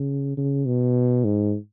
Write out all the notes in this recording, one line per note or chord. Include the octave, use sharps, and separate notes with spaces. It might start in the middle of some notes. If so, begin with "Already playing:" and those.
Already playing: C#3
C#3
B2
G#2